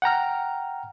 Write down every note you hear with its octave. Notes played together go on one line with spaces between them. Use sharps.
F#5 G5 A#5 F6